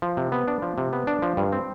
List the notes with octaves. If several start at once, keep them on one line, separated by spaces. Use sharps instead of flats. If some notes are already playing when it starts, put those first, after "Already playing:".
F3
C3
B3
D4
F3
C3
B3
D4
F3
G2
C4